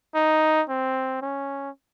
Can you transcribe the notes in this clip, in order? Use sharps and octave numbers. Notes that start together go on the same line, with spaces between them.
D#4
C4
C#4